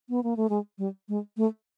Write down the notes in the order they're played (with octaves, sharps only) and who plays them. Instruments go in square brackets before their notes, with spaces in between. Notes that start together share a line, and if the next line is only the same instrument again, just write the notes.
[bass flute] B3
A#3
A3
G#3
G3
G#3
A3